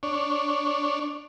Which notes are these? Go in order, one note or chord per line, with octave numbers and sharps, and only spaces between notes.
D4 C#5